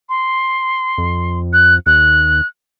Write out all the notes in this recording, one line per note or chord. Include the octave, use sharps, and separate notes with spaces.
C6
F2
F#6
D#2 F#6